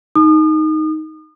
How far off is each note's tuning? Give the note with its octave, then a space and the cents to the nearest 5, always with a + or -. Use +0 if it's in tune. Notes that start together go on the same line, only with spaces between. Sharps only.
D#4 +5 D#6 -40